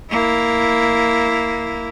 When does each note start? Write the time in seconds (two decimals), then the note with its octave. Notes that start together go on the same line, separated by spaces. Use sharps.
0.11 A#3 E4